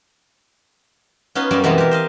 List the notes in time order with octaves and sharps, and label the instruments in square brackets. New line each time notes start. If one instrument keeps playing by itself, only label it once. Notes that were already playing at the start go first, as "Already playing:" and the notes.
[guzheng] B3 C#4 D#4 F4 B4 C6
F#2 G3 A#3 D#4 D5 A5
B2 E3 G#3 B3 C4
G4 A#4
C5 D#5 F5